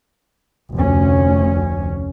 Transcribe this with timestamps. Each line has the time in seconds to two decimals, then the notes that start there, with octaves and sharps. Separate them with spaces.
0.74 F1 D2 C#4